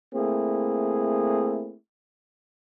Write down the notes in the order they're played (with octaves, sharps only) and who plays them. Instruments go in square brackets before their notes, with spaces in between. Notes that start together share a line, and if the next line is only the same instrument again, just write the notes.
[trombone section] A3 A#3 C4 E4 G#4